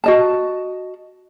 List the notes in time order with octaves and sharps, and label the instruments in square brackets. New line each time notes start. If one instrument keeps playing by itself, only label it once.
[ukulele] F#4 D#5 A5